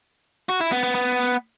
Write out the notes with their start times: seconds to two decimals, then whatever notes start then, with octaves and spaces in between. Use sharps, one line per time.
0.49 F#4
0.60 E4
0.72 B3
0.83 B3
0.95 B3